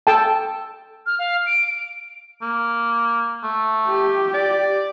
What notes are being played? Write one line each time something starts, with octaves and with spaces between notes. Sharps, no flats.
A4 G5 A5
F6
F5
D7
D7
A#3
A3
G4
D5